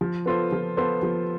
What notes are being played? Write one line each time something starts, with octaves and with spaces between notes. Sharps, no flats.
F3
B3 F4 A4 C5
F3
B3 F4 A4 C5
F3